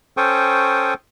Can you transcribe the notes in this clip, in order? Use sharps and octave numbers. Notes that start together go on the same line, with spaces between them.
C#4 A4 C5 G5 C#6 D#6